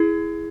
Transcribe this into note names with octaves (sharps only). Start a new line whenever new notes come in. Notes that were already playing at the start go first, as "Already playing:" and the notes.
Already playing: E4 G#4